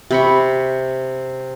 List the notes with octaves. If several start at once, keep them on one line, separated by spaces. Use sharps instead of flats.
C3 B5 C#6